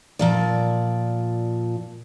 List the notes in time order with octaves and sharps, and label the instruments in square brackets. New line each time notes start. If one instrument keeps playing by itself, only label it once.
[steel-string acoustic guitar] A#2 F3 D5